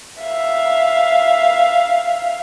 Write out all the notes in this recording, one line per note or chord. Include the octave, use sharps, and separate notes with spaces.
E5 F5